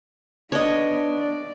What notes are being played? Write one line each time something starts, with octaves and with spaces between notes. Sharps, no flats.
B3 D4 C#5 D#5
D5